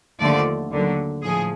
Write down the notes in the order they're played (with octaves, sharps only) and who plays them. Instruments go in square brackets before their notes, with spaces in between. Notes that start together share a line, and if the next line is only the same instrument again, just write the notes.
[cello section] D#2 D3 F3 A3 D5
D#2 D3 F#3
A2 F3 G#4